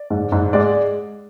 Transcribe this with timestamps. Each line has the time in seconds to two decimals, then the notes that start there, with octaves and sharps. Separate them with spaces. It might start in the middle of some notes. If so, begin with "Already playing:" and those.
Already playing: D5
0.10 G#2
0.32 G#2
0.53 G#3 D5